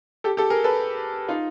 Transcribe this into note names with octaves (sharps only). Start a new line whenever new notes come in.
G4 A4
G4 A4
G#4 A#4
A4 B4
D#4 F4